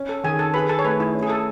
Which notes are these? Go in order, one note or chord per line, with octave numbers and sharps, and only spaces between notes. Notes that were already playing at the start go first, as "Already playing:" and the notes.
Already playing: C#4
A4
D#3 G#4 G#5
A4 A5
G#4 B4 B5
A4 A5
C#5
A3 B4
E4
C#4
G#4
A4